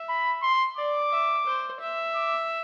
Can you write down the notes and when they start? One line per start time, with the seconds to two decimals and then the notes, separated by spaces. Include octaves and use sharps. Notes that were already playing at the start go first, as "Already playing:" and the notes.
Already playing: E5
0.09 B5
0.42 C6
0.77 D5 D6
1.12 E5
1.46 C5
1.80 E5
2.15 D6